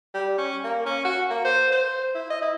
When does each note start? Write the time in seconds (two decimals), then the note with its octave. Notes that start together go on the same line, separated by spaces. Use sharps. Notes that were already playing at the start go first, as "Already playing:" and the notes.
0.14 G3
0.38 C#4
0.64 A#3
0.86 C#4
1.05 F#4
1.30 A#3
1.45 C5
1.72 C5
2.15 E4
2.30 D#5
2.42 E4